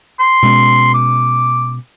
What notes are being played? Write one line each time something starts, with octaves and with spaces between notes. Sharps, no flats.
C6
B2 G#3 C#4
D6